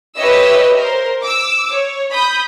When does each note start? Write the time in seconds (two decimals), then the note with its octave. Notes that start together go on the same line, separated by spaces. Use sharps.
0.16 G4 B4 C#5 D#5 E5 E6
0.76 A#4 C5
1.22 D6 E6
1.69 C#5
2.10 B5 D#6 G6